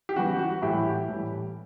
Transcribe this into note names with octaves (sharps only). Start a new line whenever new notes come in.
G4
C#3 E3 G3 B3 F#4
F#4
A2 E3 G3 E4 G4
A2 E3 G3